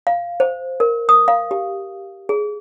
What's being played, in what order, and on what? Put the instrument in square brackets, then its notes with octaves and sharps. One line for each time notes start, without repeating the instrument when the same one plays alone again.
[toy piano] F5
C5
A#4
D#6
F5
G4
G#4